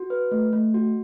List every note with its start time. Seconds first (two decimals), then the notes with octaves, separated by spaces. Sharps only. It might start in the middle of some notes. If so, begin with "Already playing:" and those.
Already playing: F#4
0.10 B4
0.31 A3
0.53 A3
0.74 F#4